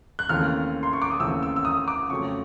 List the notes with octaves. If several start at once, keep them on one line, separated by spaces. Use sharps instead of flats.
F#6
D#2 C#3 E3 A3 C4 F6
C6
C#6
D6
D#6
D#2 C#3 E3 A3 C4 E6
E6
E6
D#6
D6
F2 C#3 F#3 A3 C4 C#6